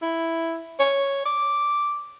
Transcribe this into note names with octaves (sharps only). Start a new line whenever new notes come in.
E4
C#5
D6